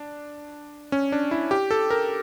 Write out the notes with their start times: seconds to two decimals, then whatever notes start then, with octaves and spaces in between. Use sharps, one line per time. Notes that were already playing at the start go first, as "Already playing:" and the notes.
Already playing: D4
0.92 C#4
1.12 D4
1.31 E4
1.51 G4
1.71 A4
1.90 A#4